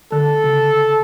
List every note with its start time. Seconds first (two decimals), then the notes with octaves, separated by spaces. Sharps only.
0.12 D3 A4
0.44 C#3